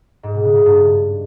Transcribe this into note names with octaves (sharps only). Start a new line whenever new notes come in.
G#2
B2
C#3
A2
G2